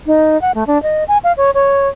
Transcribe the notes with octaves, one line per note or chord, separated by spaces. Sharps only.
D#4
F#5
A3
D4
D#5
G#5
F5
C#5
C#5